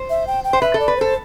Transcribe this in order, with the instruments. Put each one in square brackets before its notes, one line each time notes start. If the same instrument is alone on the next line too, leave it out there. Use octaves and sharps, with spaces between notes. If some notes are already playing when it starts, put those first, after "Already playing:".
Already playing: [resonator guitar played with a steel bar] C5
[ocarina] E5
G5
G5
[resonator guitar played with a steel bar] C5
[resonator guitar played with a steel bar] B4 [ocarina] E5
[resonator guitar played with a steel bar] A4
[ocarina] D5
[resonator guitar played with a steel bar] B4
[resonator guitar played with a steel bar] A4 [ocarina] C5